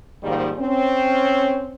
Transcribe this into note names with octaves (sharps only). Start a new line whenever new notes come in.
G#2 D#3 F3 G3 A#3
C4 C#4